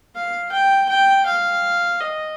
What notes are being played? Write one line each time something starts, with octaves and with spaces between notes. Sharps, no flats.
F5
G5
G5
F5
D#5